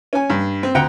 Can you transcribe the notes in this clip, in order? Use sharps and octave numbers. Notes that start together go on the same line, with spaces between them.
C#4 G#5
G2
C4
D2 F#5 G5 A#5